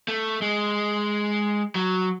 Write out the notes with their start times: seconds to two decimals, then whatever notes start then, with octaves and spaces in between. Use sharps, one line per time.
0.08 A3
0.42 G#3
1.75 F#3